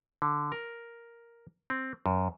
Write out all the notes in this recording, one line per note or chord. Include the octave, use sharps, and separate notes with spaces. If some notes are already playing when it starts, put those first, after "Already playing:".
D3
A#4
C4
F#2